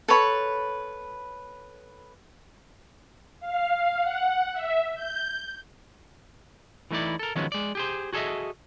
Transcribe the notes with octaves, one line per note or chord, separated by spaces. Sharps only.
A4 B4 C#5 B5
F5
F#5
E5
G6
E3 A3 D#4 E4 D5
A4 A#4
D#3 F3 F#3 G#3 B3 C#4
G#3 D5
G4 G#4 C5
F#4 G#4 A4 C5 D#5 E5